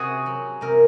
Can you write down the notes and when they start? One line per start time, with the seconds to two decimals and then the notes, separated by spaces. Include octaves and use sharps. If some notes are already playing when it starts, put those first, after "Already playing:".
Already playing: C3 F#4 G#4
0.26 F#3
0.61 C3 A#4